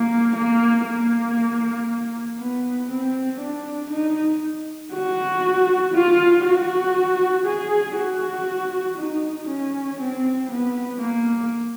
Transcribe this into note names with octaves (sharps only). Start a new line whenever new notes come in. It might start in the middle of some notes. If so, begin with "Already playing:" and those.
Already playing: A#3
A#3
A#3
B3
C4
D4
D#4
F#4
F4
F#4
G#4
F#4
D#4
C#4
C4
B3
A#3